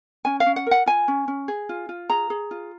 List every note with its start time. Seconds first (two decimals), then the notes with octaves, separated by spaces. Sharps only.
0.25 C#4 G#5
0.40 F5
0.46 C#4
0.56 F#5
0.66 A#4 F#5
0.86 F4 G#5
1.08 C#4
1.28 C#4
1.48 G#4
1.69 F4
1.89 F4
2.10 G#4 A#5
2.30 G#4
2.51 F4